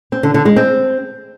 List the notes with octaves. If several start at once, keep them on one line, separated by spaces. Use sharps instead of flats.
C4
D3
D3
G#3
C4